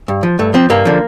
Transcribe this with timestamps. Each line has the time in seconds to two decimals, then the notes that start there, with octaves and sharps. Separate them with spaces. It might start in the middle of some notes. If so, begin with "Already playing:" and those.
0.08 G2
0.23 F3
0.39 G2 A3
0.54 F3 C4
0.70 G2 A#3
0.85 D3 F3